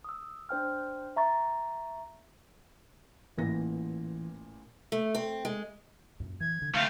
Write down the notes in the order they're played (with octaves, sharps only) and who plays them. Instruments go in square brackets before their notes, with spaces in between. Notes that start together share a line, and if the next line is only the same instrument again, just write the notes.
[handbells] D#6 E6
D4 C5 G5 F6
E5 A#5 C#6 A6
[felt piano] A1 A#2 A#6 [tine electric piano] E3
[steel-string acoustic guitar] A3
C4
G#3
[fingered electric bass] F#2 A#2
[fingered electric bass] E3 [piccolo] G#6
[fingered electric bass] D3
[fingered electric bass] D3 [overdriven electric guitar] A3 C4 [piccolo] F5